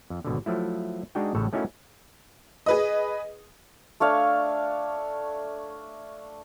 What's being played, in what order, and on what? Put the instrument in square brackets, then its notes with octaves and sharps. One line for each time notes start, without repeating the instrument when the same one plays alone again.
[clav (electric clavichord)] F2
G#1 B2 D3
F3 F#3 A3 E4
G#3 D4 D#4 F#4 G#4 G5
A1 A2 C#3 A4 C#5
A3 C#4 D#4 E4 F#4 A#4
[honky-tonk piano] G#4 B4 D#5
[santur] A3 D4 C#5 F5